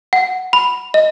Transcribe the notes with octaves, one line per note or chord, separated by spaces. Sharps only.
F#5
B5
D#5